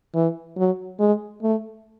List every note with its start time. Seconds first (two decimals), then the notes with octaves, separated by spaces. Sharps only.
0.14 E3
0.57 F#3
1.00 G#3
1.43 A3